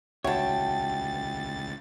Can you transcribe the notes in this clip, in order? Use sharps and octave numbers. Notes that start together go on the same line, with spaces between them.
C#2 F#4 C#5 E5 F#5 G5 A5 A6